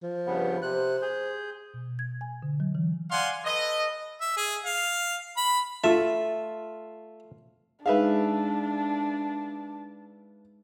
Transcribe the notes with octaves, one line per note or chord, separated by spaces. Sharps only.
F3
G2 C#3 B3
C3 C5 F#6
G#4 G6
B2
G#6
G#5
D3
F#3
E3
D5 F5 F#5 G#5 C6
A4 B4 D#5
E5
G#4
F5
B5
A3 F4 A4 E5
G#3 D4 D#4 G#4 B4 E5 F5 A5